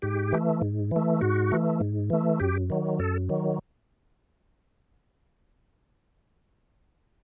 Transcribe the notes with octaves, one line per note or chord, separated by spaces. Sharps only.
G#2 G4
E3 A3
G#2
E3 A3
G#2 F#4
E3 A3
G#2
E3 A3
F#2 G4
D#3 F#3
F#2 A4
D#3 F#3